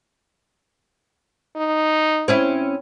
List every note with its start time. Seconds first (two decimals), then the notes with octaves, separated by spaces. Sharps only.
1.57 D#4
2.28 C4 C#4 E4